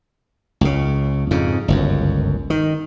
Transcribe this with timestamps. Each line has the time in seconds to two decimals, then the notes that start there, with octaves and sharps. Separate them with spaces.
0.61 C#2 C#3
1.31 F2 G#2 C#3
1.68 G1 C#2 F#2
2.50 D#3